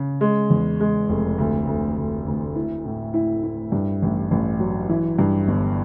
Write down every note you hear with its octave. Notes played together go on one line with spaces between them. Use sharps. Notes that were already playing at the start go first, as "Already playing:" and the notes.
Already playing: C#3
G#3
E2
G#3
F1
D2
D2
D2
D2
E4
A2
E4
E4
G2
A1
A1
F#3
E3
G2
G1